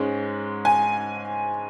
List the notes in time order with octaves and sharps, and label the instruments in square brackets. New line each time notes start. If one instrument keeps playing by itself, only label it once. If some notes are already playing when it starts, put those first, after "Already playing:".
Already playing: [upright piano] G#2 G#3 C#4
G#5